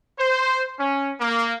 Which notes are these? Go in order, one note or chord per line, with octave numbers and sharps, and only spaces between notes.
C5
C#4
A#3